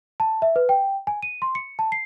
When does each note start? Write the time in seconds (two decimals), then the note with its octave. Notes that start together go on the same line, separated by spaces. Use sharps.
0.20 A5
0.42 E5
0.56 B4
0.69 G5
1.07 G#5
1.22 D#7
1.42 C6
1.55 C#7
1.79 A5
1.92 C7